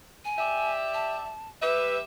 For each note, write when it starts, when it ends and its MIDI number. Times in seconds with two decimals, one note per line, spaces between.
0.25 0.71 80
0.38 1.32 67
0.38 1.32 74
0.38 1.32 76
0.94 1.49 81
1.62 2.02 55
1.62 2.02 67
1.62 1.97 71
1.62 2.02 76